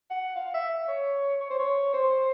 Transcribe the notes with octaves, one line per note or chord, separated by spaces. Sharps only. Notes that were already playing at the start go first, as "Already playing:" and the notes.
F#5
F5
E5
C#5
C#5
C5
C#5
C5